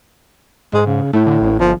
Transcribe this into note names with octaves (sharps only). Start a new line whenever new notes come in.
G#2 G#3
C#3
A2 A3
D3
A1
G1 F3